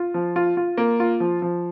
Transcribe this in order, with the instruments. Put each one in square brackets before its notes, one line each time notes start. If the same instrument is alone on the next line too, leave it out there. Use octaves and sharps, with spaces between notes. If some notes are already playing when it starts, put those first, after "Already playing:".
Already playing: [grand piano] F4
F3
F4
F4
A#3
F4
F3
F3